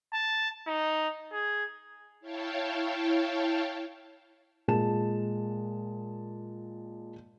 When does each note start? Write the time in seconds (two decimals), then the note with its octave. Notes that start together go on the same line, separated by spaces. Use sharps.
0.14 A5
0.67 D#4
1.32 G#4
2.20 E4 C#5 F5 G5 A5
4.68 A#2 G#3 A5 E7